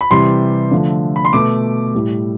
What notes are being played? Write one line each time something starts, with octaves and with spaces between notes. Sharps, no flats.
B5
C3 E3 G3 C6
D3 F3 A3
B5
C6
B2 A3 D6
A2 G3